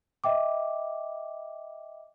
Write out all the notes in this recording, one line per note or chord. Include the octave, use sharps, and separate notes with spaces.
D#5 E5 G5 D6